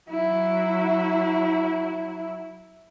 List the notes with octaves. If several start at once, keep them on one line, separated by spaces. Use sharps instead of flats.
F#3 E4